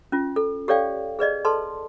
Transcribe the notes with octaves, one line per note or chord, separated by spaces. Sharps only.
C#4 F4
A4
G4 A4 C#5 D5 F5 G5
G#4 B4 D5 D#5
A4 B4 A5 C6